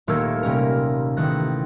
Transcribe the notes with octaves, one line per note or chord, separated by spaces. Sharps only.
D#1 A3 A#3 A#4 E6 G#6
C3 G3 A#3 C#4 A#4
A1 D#3 A3 F#6 A#6